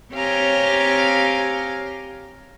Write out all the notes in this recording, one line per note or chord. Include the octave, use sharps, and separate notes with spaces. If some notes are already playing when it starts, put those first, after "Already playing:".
C4 G4 C#5 F5 G#5 A#5